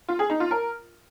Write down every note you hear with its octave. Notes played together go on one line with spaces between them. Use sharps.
F4
G#4
D#4
F4
A#4